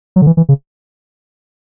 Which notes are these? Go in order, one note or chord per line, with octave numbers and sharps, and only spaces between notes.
F#3
D3
E3
E3
C#3